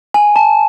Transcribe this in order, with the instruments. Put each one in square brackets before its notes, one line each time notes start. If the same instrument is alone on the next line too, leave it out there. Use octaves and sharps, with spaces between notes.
[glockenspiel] G#5
A5